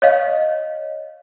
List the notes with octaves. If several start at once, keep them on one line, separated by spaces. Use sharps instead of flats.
C#5 D#5 F5